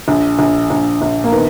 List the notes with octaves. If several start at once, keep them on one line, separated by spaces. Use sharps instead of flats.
A#1
A#1
A#1
A#1
A#3
D#3 B3